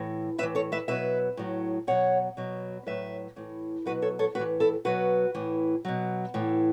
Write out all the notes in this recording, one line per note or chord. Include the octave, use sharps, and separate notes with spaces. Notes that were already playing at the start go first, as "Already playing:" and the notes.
Already playing: A2 E3
A2 E3 B4 E5
A4 C#5
B4 E5
B2 F#3 B4 E5
A2 F#3
B2 F#3 C#5 F#5
B2 F#3
A2 F#3 B4 E5
A2 E3
B2 F#3 F#4 B4
A4 C#5
A4 C#5
A2 E3 F#4 B4
E4 A4
B2 F#3 F#4 B4
A2 E3
B2 F#3
A2 E3